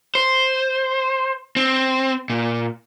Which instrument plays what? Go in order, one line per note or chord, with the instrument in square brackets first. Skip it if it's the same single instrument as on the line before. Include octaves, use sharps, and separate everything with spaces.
[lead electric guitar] C5
C4
A#2